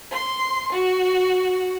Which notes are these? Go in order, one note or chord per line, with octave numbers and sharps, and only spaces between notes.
C6
F#4